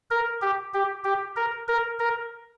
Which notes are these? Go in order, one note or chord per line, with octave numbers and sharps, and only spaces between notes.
A#4
G4
G4
G4
A#4
A#4
A#4